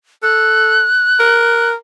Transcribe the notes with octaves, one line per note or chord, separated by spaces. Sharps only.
A4 F#6
A#4